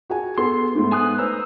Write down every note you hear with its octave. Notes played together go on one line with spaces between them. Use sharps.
F#4 G#4 G#5
B3 G#4 A4 C6
G#2 A3 B3
G#5 D#6 F#6
B4 C5 A#5 E6